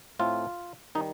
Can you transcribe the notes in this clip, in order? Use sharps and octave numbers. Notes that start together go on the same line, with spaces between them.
A2 A3 C4 F4
D#3 G3 D#4